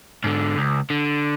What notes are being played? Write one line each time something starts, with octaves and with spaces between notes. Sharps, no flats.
G#2 D3
C#2
D3